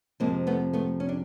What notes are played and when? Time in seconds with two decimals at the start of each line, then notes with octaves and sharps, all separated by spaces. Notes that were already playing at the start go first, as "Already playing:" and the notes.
0.20 F2 C3 F3 G#3 A#3
0.47 A3 B3
0.73 A3 B3
1.00 C#4
1.09 D4